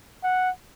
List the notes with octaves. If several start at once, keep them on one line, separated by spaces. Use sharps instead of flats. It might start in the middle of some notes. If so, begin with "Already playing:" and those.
F#5